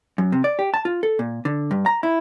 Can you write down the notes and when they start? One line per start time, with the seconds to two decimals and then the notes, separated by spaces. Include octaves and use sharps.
0.18 F#2
0.32 C3
0.44 D5
0.59 G4
0.74 A5
0.85 F4
1.03 A4
1.19 A#2
1.45 D3
1.71 G2
1.86 A#5
2.03 E4